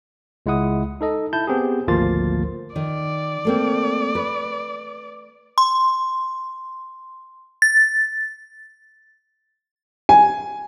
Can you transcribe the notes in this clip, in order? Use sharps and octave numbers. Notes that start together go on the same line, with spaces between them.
C#2 G#3 E4 F#5 D#6
D#4 A4 D#5
E4 A5 G6
B3 C4 G4 G#4
G#1 D2 F3 A#3 F4 A6
D#3 D5
A3 A#3 C4
B4
C6
A6
G#5